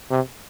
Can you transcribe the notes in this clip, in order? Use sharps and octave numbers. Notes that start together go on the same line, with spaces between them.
C3